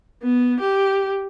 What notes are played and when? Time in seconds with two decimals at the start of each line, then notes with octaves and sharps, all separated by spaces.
0.23 B3
0.60 G4